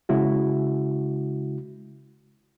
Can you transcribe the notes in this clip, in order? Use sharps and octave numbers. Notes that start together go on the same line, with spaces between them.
C#3 G#3 E4 F#4